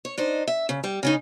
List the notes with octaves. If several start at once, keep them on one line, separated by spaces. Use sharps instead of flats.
C#5
D4 D#4 C5
E5
C#3
G3
C#3 C#4 D#4